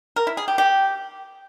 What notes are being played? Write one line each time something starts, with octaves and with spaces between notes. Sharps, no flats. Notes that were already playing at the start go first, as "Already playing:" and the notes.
A#4
E4
G#4
G4
G4